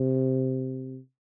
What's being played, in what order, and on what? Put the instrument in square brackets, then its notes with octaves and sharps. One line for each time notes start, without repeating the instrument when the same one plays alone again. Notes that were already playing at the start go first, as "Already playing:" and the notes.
Already playing: [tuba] C3